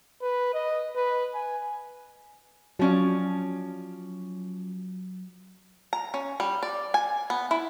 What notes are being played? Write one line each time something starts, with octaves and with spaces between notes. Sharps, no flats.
B4
D#5
B4
G#5
F3 F#3 C#4 D5
A#5
C#4
G3
D5
G#5
B3
E4